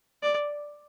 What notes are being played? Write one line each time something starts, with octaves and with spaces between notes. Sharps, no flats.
D5